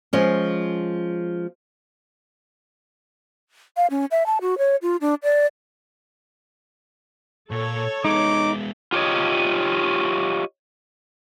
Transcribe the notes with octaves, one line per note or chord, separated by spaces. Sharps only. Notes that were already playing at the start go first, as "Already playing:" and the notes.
F3 G#3 C#4
F5
C#4
E5
A5
F#4
C#5
F4
D4
D5
A#2 A4 C#5
G#3 B3 D#4 D6
F4 G4 A4 C#5 D#5